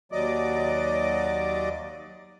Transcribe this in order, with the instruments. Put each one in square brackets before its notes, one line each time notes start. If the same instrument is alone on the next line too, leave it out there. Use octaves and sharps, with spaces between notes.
[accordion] D#2 F#3 D5 D#5 D6